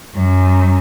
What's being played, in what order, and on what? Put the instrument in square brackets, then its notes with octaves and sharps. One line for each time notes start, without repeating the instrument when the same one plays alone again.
[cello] F#2